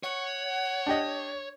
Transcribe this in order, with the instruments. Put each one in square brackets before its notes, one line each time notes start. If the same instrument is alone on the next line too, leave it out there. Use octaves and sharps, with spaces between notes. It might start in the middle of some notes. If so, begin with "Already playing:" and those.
[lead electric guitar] C#5 [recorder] F#5
[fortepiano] D4 G4 D#5